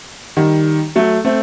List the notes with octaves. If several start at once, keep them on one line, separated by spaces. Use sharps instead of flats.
D#3 G3
F#3 A3
A3 C4